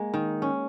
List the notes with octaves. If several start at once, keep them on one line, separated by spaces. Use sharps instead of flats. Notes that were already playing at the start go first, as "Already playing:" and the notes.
Already playing: G#3 A#3
D#3
C#4